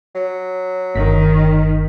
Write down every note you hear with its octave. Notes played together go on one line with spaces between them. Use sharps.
F#3
G1 D#3 B6